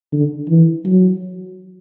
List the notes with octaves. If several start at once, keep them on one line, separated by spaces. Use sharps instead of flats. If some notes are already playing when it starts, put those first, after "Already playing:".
D3
E3
F#3